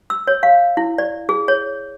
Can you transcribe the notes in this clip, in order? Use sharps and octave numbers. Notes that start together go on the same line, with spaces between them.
E6
C#5
F5
E4
D5
G#4
C#5